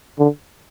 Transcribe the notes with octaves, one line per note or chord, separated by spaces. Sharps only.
D3